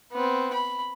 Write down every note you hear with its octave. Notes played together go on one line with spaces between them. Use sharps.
B3 C4
B5